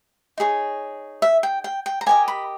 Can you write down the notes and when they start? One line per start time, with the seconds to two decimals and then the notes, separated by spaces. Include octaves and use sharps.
0.38 D#4 G#4 C#5
1.22 E5
1.43 G5
1.64 G5
1.86 G5
2.01 A#5
2.06 G4 A#4 D#5 G#5
2.28 B5